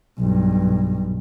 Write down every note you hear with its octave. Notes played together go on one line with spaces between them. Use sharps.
B1 G2